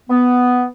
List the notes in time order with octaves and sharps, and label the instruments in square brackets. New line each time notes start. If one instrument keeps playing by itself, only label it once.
[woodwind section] B3